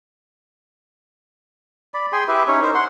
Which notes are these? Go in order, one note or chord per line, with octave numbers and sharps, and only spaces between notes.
D5 B5
G#4 G5 G#5 C6
E4 G4 B4 E5
C#4 D#4 C#5
D#4 A#4 C5
F#5 C6